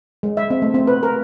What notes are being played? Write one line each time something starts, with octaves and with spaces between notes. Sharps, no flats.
G#3
E5
C4
A3
C4
B4
A#4